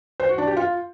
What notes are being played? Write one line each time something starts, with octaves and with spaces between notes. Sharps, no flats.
C5
F#4
D4
G4
F4